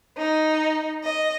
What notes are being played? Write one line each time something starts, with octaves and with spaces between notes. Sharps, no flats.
D#4
D#5